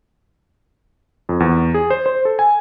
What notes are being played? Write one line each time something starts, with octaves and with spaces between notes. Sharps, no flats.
F2
E2
G#4
C5
C5
A4
G#5